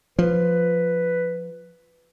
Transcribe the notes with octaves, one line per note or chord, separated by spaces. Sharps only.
F3 B4